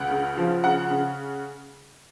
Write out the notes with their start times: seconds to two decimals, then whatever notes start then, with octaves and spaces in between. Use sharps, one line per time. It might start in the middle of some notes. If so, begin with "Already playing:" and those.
Already playing: C#2 F#5
0.10 C#3
0.37 F3
0.64 C#3 F#5
0.90 C#3